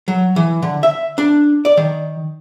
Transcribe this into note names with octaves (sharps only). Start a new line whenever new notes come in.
F#3
E3
D3
E5
D4
D5
D#3